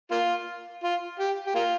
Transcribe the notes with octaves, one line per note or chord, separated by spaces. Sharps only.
A#3 F4
F4
G4
G4
A#3 F4